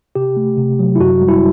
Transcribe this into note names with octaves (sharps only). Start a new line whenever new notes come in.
C3 G4
A3
C3
F#3
E4
F#2 F#4
G3
E4